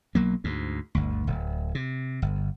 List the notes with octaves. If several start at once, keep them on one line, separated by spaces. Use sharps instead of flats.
B1 F#3 A#3
D2 G#2
G1 D2
D1
C3
G1